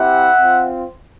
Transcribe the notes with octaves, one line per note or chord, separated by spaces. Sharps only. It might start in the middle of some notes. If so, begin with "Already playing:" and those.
Already playing: C4 E4 G4 E5 F#5
C4 F4